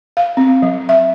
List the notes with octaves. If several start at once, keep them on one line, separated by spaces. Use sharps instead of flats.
F5
C4
F#3
E5